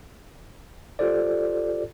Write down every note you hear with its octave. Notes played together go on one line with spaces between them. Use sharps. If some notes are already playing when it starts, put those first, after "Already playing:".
F4 G4 A4 C5 D5